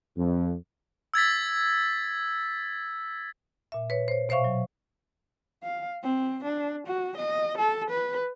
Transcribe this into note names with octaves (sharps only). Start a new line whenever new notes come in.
F2
E6 G#6 A6 B6
A#2 E5
B4 C#5
C5 C#5
B2 C5 E5 F5 C#6
F#3
F5
C4
D4
F#4
D#5
A4
B4